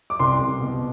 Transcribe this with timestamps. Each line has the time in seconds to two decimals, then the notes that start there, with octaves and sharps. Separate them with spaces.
0.10 D6
0.19 C2 C6
0.40 C2
0.61 B2